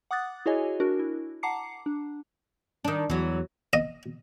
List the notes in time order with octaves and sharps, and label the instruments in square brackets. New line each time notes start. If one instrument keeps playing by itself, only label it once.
[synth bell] F#5 D6 D#6 F#6 A6
E4 F#4 G#4 C#5 D#5 G#5
D4 F#4 A#4
E4
F#5 A5 A#5 D6 C7 C#7
D4
[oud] D#3 D4
[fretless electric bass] E2 [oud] E3 F#3
[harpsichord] D#5